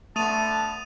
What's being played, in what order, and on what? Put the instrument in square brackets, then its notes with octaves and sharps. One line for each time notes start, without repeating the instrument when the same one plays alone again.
[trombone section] D3 B3 [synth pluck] A3 [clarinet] A5 [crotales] D#6 D#7 F7